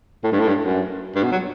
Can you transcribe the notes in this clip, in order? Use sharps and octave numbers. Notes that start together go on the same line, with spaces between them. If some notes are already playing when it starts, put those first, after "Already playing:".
A2
G2
A2
G2
F#2
G2
B2
F#3